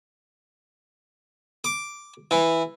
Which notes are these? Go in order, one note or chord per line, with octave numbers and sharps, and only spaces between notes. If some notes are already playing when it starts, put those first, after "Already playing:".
D6
E3